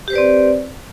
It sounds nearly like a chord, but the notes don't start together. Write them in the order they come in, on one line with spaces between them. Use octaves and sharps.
G4 C5 B4 D5 C4